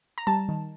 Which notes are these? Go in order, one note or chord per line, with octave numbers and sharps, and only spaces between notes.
A#5
G3 A5
D#3